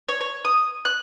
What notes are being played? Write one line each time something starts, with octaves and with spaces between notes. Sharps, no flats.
C#5
C#5
D#6
F#6